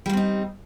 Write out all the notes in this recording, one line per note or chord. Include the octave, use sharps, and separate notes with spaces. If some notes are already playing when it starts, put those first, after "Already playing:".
G3 A#3 C4 D#4